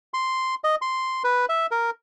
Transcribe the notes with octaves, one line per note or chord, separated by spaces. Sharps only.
C6
D#5
C6
B4
E5
A#4